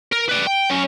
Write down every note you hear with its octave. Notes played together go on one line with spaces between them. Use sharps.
A#4
B4 D5
G5
F#3 C#4